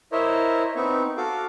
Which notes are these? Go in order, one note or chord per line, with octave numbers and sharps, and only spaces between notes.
E4 A#4 C5 C#5 D#5 E5
B3 C4 D#4 C#6
F#4 A4 F5 D6